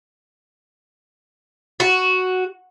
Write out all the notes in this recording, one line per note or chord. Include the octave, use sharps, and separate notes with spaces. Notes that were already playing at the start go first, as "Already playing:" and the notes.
F#4